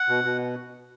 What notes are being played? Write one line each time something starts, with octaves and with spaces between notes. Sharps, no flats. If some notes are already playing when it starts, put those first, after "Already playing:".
Already playing: F#5
B2
B2